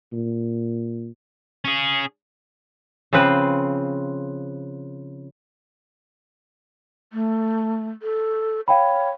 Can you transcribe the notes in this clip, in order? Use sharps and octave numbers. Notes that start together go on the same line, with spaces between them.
A#2
C#4 G#4
C#3 F3 C4 B4
A3
A4
C#5 F5 G5 B5